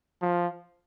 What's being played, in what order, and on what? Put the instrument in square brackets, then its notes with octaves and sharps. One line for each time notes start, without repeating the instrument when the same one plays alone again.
[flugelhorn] F3